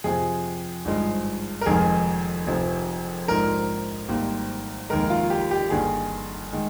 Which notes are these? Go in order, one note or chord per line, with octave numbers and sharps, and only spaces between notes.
F2 C3 F3 G#4
G#1 G2 F3 G#3
A#4
F1 F2 D#3 G#3 G#4
F1 F2 C3 F3
A#1 G#2 F3 A#4
G#1 G#2 G3 A#3
F1 D#2 D#3 G#3 A#4
F4
G4
G4
G1 G2 D#3 A#3 G#4
D#3 G#3